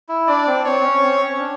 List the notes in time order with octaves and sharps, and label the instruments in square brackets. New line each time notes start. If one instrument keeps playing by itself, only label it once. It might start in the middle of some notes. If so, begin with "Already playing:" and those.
[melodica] E4
[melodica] D4 [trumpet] D5
[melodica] C4
[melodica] C4 [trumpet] C#5
[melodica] C4
C#4
C4
C#4
D4